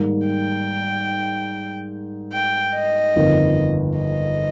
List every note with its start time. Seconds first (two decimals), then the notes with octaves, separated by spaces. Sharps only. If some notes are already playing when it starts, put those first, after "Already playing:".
Already playing: G#2 D#3 G3 A#3
0.26 G5
2.33 G5
2.74 D#5
3.16 G1 F2 D#3 A#3
3.98 D#5